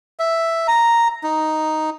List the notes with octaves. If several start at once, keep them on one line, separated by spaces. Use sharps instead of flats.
E5
A#5
D#4